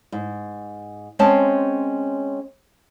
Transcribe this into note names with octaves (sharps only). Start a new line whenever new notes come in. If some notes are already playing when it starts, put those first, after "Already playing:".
G#2
G#3 C4 C#4 A5